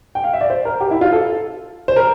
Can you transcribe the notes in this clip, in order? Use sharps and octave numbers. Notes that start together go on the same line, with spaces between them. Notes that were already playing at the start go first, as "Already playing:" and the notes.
G5
F5
E5
D5
C5
A#4
G4
E4
F4
A4
C5
A#4